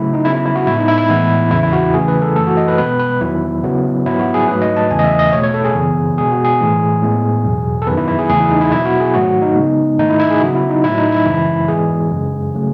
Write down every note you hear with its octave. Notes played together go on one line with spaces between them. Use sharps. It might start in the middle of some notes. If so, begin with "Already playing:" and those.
Already playing: C#3 F#3 A3 E4
D#4
C#3 F#3 B3 E4
E4
E4
F#4
A2 G#3 B3 E4
D#4
E4
E4
A2 E3 G#3 B3
E2 C#3 E3 E4
E4
F#4
C#3 E3 A3 G#4
B4
A4
F#2 E3 A3 A4
F#4
D#5
B4
B2 G#3 B3 B4
B4
E2 D#3 F#3 B3 E4
C#3 F#3 B3
G#2 F#3 B3 E4
F#4
G#4
G#2 F#3 A3 B4
D#5
A5
E2 C#3 E3 A3 G#5
D#5
E5
D#5
B2 A3 C#5
C#5
A4
G#4
F#2 C#3 E3 B3
B2 G#3 B3 G#4
F#4
G#4
A2 E3 A3
A2 G#3 B3
E2 B2 F#3
A4
F#2 D#3 F#3 B3 B4
E4
E4
G#4
E2 C#3 E3 A3 G#4
E4
D#4
E4
B2 F#3 B3 E4
F#4
G#4
G#2 D#3 F#3 A3 F#4
D#4
C#3 G#3 B3
G#2 D#3 A3 D#4
E4
E4
G#4
C#3 F#3 B3 F#4
E4
D#4
A2 F#3 A3 E4
D#4
E4
F#2 C#3 E3 G#3
G#2 E3 G#3 B3 G#4
F#2 C#3 G#3
C#3 F#3 A3